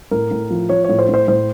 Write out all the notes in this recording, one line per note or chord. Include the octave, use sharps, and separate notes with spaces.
A2 A#4
A2
F3
F3 C#5
A2 C#5
C5
A2 C5
A2 C5